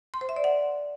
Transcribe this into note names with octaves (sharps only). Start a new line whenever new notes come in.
C6
C5
E5
D5
F#5